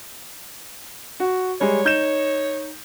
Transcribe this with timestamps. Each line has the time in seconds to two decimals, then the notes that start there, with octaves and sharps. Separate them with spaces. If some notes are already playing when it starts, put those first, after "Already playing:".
1.20 F#4
1.61 G3 G#3 C#5
1.85 D#4 G6 E7